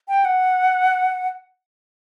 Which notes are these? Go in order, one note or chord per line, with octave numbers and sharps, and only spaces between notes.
G5
F#5